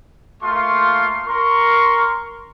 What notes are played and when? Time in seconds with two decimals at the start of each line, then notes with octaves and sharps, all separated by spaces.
0.42 A3 A#3 F4 F5 C6 C#6
1.27 A#4 C6 C#6